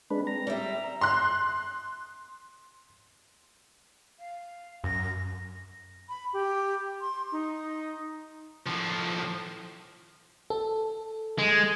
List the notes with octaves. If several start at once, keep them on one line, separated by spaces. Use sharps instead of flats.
G#3 C4 D4 B4
A#5
G3 E5
C6 F#6
F5
F#2 A#6
B5
G4
C6
D#4
A2 F3
A4
G#3